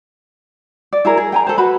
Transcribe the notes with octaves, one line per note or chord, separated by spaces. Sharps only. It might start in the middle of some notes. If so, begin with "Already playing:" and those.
D5
E4 G#4 A#4
G#4
G5 G#5 A#5
A4 C5
F#4 B4 B5